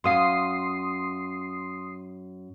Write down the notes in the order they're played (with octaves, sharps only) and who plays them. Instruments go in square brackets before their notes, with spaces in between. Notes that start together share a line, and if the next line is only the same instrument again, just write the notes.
[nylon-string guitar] F#2 F5 [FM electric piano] C6 D#6 C7